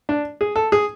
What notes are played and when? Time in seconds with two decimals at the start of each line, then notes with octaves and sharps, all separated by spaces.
0.09 D4
0.41 G#4
0.56 A4
0.72 G#4